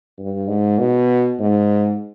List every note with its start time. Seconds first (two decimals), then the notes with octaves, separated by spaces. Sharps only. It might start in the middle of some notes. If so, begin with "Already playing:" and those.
0.19 G2
0.48 G#2
0.79 B2
1.39 G#2